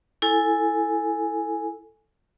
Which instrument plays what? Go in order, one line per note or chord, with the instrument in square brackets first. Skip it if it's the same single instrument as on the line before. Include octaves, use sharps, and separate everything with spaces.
[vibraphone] E4 A4 G#5